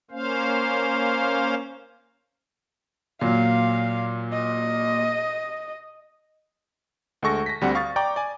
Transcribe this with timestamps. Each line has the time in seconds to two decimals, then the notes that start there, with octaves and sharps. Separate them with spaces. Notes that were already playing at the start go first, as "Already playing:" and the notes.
0.11 A#3 C#4 C5 F5
3.21 A#2 F#3 F5
4.33 D#5
7.22 D2 G#3 A4 C#6 A#6
7.46 A#6 B6
7.61 D2 G3 C4 F#5
7.75 F5 C#6 D#6 A6
7.96 D5 G5 A#5 C#6 D6
8.16 D5 G#5